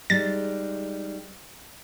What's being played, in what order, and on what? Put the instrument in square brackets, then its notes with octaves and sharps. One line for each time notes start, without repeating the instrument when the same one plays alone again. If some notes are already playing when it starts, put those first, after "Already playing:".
[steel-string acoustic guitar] G3 G#3 D#4 [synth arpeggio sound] A6